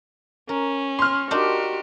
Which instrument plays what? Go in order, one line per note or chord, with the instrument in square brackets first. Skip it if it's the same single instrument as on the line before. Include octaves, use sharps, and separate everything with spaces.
[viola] C#4 [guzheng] A#4
[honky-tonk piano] C6 F6
[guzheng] D4 D#4 A#4 [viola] F#4 G4